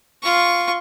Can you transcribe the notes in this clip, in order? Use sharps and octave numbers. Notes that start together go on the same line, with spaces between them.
F4 C#6